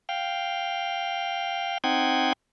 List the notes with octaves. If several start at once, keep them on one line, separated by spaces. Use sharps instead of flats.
F5 G5
C4 D#4 F#5 G5 G#6